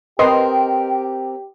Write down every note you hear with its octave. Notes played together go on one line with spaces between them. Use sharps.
C4 G4 A#4 B4 D#5 G5 C6